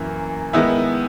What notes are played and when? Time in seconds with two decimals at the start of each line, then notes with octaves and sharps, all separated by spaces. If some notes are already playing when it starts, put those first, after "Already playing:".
Already playing: F#2 E3 A#3
0.53 D#3 G#3 B3 E4